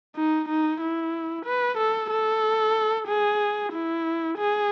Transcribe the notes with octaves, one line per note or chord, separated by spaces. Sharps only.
D#4
D#4
E4
B4
A4
A4
G#4
E4
G#4